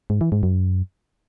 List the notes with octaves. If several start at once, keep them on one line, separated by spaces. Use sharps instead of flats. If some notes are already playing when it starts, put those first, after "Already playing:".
G#2
E3
G#2
F#2